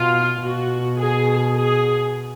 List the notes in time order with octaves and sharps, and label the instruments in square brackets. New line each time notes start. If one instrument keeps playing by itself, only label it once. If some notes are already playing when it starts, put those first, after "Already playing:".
Already playing: [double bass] B2 [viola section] F4
[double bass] B2 [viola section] F#4
[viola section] G#4
G#4